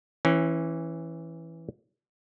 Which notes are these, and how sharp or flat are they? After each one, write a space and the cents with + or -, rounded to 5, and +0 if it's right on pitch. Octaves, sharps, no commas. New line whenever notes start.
E3 +0 C#4 -25